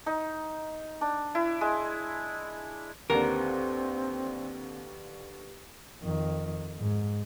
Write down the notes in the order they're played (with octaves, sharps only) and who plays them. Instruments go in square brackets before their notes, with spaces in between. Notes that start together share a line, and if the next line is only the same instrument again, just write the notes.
[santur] D#4
D4
E4
G#3
[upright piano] D#2 D3 [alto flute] C4 [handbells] G4 B4 F#5 [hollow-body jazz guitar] A#4
[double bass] F2 D#3
G#2